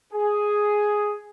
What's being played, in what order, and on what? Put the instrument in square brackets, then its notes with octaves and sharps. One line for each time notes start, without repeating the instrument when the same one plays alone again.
[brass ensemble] G#4